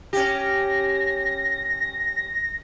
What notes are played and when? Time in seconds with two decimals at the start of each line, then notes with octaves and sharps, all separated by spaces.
0.13 C#4 G4 A#6